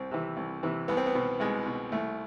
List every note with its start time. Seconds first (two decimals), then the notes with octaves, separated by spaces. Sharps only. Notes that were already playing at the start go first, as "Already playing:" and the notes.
Already playing: C2 C4
0.11 C3 E3
0.37 C2
0.63 C3 E3
0.88 C2 B3
0.97 C4
1.06 B3
1.15 B2
1.40 C2 G#3
1.66 B2
1.92 C2 A3